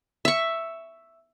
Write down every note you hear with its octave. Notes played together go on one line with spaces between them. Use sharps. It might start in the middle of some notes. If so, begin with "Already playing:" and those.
E5 C#6